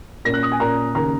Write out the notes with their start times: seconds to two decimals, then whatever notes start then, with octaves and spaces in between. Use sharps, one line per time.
0.25 A#2 A#3 C#4 A#6
0.34 F#6
0.43 D#6
0.52 G#5
0.60 A#2 A#3 C#4 A#5
0.94 D#2 C#3 A#3 A#5